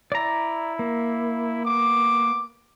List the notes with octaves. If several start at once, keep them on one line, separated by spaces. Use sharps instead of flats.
E4 D5 A#5
A#3
B3 D6